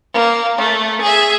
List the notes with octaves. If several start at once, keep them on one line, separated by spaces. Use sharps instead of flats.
A#3
A3
G#4 E5